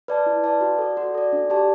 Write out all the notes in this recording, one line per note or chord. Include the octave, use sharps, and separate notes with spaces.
B4 D5 A5
E4
B4 D5 A5
F#4
A4 D5
F#4
A4 D5
D4
G4 D5 A5